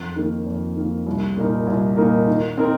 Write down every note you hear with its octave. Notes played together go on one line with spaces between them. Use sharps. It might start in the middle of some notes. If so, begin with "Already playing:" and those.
Already playing: F2
D#3 A#3
F2
D#3 A#3
C2
A#2 A#3 D#4 A#4
C2
A#2 A#3 D#4 A#4
D#3
C4 D#4 A#4